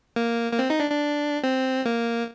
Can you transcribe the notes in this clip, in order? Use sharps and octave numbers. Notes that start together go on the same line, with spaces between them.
A#3
A#3
C4
D#4
D4
D4
C4
A#3